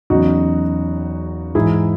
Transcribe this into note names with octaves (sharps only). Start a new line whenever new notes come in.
E2 C#3 F#3 D#4 F#4
G#2 E3 E4 G#4